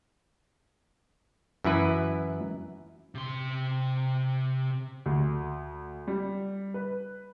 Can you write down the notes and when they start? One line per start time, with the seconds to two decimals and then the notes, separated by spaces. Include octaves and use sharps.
1.64 F#2 E3 E4 B4
3.15 C3 C6
5.06 D2
6.08 G3
6.74 B4